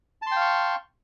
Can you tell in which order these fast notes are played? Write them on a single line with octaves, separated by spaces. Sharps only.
A5 C6 G5 F5 C#6